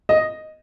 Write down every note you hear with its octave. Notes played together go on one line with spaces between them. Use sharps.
D#5